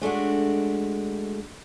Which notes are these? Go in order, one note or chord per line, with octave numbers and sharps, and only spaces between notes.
G#3 A3 D4 F#4